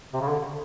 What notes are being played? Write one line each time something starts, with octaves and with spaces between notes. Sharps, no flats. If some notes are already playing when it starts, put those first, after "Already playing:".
C3
C#3
D3